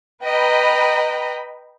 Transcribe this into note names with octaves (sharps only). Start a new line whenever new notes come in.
B4 D#5 G5 A#5 B5